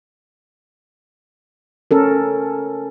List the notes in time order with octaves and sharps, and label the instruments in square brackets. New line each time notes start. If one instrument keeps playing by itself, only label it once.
[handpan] C#4 A4 A#4